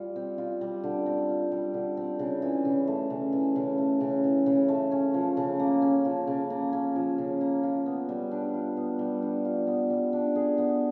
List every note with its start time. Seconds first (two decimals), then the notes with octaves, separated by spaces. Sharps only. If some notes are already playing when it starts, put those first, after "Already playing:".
Already playing: G3 F4
0.16 C4
0.38 F4
0.61 G3
0.83 D3
1.06 C4
1.29 F4
1.51 G3
1.74 D3
1.97 C4
2.19 C#3
2.42 E3
2.65 C#3
2.87 A3
3.10 C#3
3.33 E3
3.56 C#3
3.78 A3
4.00 C#3
4.24 E3
4.46 C#3
4.68 A3
4.91 C#4
5.14 F3
5.37 C#3
5.59 A#3
5.82 C#4
6.05 F3
6.27 C#3
6.50 A#3
6.73 C#4
6.96 F3
7.18 C#3
7.41 A#3
7.63 F4
7.86 B3
8.09 G3
8.31 D4
8.54 F4
8.77 B3
8.99 G3
9.22 D4
9.45 F4
9.67 B3
9.90 G3
10.13 D4
10.35 G#4
10.58 B3